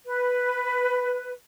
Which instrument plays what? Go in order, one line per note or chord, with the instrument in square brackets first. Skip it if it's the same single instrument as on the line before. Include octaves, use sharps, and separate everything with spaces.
[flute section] B4